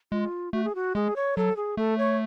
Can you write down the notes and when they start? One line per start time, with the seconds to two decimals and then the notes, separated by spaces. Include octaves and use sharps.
0.12 G#3 F4
0.53 A3 F#4
0.64 G#4
0.75 F#4
0.95 G#3 G#4
1.16 C#5
1.37 F#3 A4
1.56 G#4
1.77 A3 A4
1.98 C#5